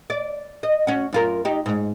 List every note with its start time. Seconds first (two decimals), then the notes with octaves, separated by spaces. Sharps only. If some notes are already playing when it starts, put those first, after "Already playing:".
0.10 D5
0.63 D#5
0.87 C#4 F#4
1.13 F#2 F4 A#4
1.45 D#4 G4
1.66 G#2